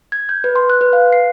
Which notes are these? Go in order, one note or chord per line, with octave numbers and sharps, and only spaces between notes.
G#6
G6
B4
C6
F#6
B4
F5
C7